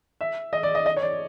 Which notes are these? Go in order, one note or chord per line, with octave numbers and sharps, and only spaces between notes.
E5
D#5
D5
D#5
D#5
C#5
D5